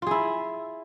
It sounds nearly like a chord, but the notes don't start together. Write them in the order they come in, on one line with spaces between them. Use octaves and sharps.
F4 G#4 E4